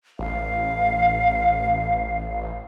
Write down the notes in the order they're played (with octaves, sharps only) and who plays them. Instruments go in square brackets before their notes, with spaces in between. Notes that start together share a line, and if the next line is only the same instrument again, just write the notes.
[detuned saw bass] A1 [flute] F5